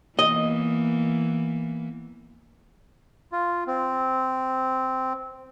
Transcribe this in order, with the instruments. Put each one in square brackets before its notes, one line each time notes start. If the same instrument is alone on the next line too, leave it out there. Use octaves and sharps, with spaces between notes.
[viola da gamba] E3 A#3 B3 [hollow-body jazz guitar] D#5
[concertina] F4
C4